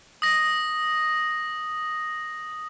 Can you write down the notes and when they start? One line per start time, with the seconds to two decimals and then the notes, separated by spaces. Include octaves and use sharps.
0.22 D#6 A#6